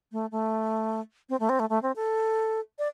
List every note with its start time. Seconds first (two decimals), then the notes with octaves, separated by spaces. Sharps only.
0.12 A3
0.31 A3
1.29 C4
1.40 A3
1.49 C4
1.59 A3
1.69 A3
1.82 C4
1.96 A4
2.79 D5